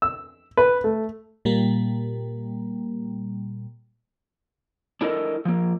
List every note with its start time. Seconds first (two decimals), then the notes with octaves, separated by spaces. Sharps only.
0.02 E6
0.57 B4
0.84 A3
1.45 A#2 G3 A#3
5.01 D4 E4 A4 A#4 D#5
5.45 F3 A#3